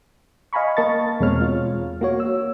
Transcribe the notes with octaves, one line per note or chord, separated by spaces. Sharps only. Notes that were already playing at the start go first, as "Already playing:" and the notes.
D#5 F5 G#5 A#5 B5 C#6
A#3 A#4 D#5 A5 C#6 A6
E2 B2 G#3 C4 C#5 F6
F4
A#3 F#4 C#5
E6